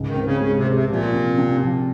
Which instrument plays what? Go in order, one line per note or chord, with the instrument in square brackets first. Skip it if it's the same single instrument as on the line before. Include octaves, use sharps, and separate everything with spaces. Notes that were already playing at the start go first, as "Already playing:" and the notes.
Already playing: [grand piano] C#2 G#2
[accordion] D#3
[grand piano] C4
[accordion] C#3
[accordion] C#3 [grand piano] G#3
[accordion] C3
[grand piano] G#3
[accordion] C3
[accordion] A#2 [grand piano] F3
[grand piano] C3
C3
F3